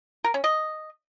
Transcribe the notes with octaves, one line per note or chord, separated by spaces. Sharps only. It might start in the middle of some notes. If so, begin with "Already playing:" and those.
A#4
C#4
D#5